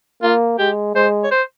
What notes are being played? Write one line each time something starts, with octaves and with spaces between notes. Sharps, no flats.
A#3 F4
G#3 G4
G#3 C5
C#5
C5